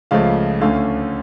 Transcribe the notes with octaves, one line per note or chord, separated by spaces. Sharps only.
C#2 C#3 F3 A3 F5
D2 D3 A3 C#4 F5